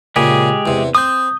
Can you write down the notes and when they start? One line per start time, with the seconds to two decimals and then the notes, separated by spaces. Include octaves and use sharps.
0.16 A#2 C#3 G#3 G4 G#4
0.66 E2 C3
0.95 C4 D#6 G6